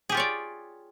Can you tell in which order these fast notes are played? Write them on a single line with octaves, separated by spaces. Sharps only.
G#4 G4 F4 C#5 D5